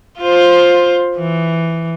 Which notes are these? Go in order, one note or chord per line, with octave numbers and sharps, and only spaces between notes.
F4 C5
E3